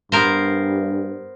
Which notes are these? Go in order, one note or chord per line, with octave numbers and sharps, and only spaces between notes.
G2 B3 A#4 C5